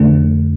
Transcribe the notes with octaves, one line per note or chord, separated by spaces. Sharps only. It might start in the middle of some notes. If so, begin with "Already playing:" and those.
Already playing: F2 D3 A3